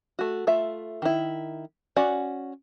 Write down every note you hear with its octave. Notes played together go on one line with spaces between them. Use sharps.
A3 F#4
A3 F4 E5
D#3 E4
C#4 F#4 D5 F#5